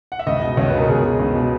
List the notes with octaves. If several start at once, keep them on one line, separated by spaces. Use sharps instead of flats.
F#5
E5
C#2 D#5
B2 D#5
C#2 C#5
B4
B2
A#4
C#2 G#4
B2
C#2
B2